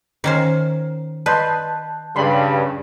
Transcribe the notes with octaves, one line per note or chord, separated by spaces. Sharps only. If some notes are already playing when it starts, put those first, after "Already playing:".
D#3 C#4 A#4 C5
B4 D5 D#5 A5 C6 F#6 G6
G2 C#3 D5 B5 C6